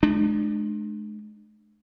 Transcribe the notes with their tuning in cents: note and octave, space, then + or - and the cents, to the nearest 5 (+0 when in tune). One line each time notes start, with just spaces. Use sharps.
G#3 +40 D4 +35